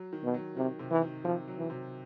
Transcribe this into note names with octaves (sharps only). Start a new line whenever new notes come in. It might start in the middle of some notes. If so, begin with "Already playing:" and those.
Already playing: F#3
D#3
B2
F#3
C3 D#3
C3
E3
D#3
C3 F3
F#3
E3
C3